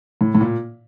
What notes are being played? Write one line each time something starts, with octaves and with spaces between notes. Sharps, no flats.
A2
A2
A#2